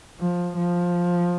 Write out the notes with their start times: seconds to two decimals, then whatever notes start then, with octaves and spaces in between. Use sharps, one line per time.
0.20 F3
0.56 F3